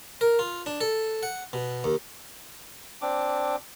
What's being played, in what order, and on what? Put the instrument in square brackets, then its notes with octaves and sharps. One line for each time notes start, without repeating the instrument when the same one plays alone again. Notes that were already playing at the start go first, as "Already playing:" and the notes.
[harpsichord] A#4
F4
D4
A4
F#5
B2
D#2
[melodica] C4 D4 D6